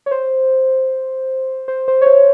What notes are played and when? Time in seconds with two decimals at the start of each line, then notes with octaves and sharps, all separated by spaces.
0.06 C#5
0.11 C5
1.68 C5
1.88 C5
2.01 C#5
2.06 C5